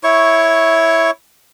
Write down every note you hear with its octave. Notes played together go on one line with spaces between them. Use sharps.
E4 C#5 C#6